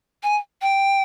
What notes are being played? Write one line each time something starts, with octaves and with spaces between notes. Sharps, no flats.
G#5
G5